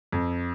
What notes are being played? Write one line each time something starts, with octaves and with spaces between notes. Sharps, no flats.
F2